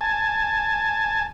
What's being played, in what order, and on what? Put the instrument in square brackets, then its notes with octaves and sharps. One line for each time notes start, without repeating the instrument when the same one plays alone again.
[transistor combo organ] G#5 A5